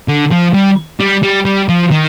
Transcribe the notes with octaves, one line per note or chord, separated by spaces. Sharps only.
D3
F3
G3
G3
G3
G3
F3
D#3